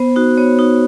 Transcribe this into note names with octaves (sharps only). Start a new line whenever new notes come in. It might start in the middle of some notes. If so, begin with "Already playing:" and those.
Already playing: B3 C5
D#4 F#4
B3 C#5
D#4 F#4